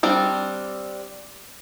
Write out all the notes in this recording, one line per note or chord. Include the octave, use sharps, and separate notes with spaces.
G3 C4 D4